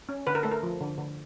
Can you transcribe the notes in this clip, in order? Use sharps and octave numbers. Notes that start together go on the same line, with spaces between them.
C#4
D3 B4
A#4
A3 A4
A#4
F3
D3
D3